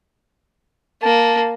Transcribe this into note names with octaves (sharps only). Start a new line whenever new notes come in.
A#3 A5